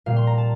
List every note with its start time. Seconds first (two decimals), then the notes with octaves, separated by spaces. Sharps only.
0.06 A#2 G3 A#3 F5
0.16 C6
0.27 A#5
0.38 A5